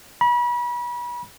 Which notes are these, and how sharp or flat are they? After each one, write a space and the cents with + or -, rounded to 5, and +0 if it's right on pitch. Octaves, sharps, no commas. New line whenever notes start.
B5 -35